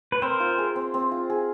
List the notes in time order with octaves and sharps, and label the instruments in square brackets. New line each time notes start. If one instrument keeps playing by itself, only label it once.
[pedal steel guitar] B4
[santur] C4 [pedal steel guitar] A#4 C5
[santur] F4
G#4
C4
C4
F4
G#4